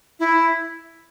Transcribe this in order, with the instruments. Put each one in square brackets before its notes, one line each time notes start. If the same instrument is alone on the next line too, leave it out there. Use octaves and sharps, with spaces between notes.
[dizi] E4